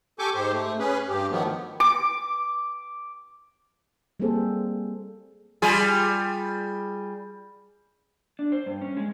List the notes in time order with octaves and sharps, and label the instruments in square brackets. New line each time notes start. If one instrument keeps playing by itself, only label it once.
[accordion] G4 A4 G#5 C#6 D6 G6
G#2 G4 C5
A3
C#4 G#4 B4
G2 G4
D#3 F3 F#3 A3 B3
[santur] D6
[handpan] G3 A#3 C4 G#4 A4 C5
[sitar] G3 F4 G#4
[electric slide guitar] D4
C5
G2
C#4
G#3